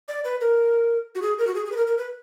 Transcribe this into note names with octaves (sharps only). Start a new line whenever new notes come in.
D5
B4
A#4
F#4
G#4
A#4
F#4
G#4
G#4
B4
A#4
A#4
B4